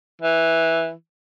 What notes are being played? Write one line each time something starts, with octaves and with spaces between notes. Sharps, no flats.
E3